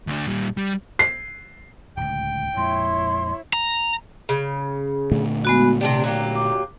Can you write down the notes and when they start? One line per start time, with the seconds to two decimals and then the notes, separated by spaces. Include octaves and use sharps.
0.07 D2 D4
0.26 A#2 G3
0.57 G3
0.99 C7
1.97 D1 C#2 G5
2.57 F2 A#2 G#3 E4 C#5 C6
3.53 A#5
4.29 C#3
5.11 A#2 D3 A3
5.45 G#3 B3 F#4
5.81 C3 D4 G4 D5
6.04 F#3 A#3 G4
6.36 D6